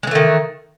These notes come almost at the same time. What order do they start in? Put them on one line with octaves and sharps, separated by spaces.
G#3 E3 A3 D#3